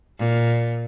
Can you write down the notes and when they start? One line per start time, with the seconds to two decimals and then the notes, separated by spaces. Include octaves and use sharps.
0.19 A#2